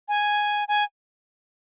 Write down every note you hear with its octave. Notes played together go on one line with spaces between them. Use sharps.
G#5
G#5